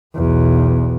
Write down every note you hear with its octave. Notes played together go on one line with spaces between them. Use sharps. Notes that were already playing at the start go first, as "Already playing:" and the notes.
B1 E2